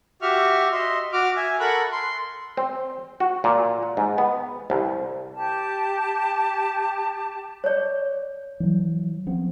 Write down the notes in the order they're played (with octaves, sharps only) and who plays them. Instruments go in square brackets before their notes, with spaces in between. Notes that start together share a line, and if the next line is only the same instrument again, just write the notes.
[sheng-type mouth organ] F#4 G4 E5 C#6 F6
D#5 E5 C6
F#4 D6 F6
E5 G#5
A4 A#4 F#5 B5 C#6 F#6
C6
[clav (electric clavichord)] C4
F#4
A#2
F#5
G#2
B3
C2
[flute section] G4 A5
[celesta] C#5 D5
[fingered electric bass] E3 F#3
F3 B3 C4